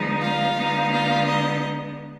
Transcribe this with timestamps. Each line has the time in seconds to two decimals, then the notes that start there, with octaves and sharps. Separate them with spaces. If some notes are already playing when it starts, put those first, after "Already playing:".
Already playing: D3 F3 G#3 B3 D#4
0.21 F4 F5
0.56 D3 G#3 B3 D#4
0.90 F4 F5
1.26 D#4 D#5